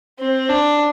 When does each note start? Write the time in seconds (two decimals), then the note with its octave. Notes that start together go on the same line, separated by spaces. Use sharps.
0.19 C4
0.49 D4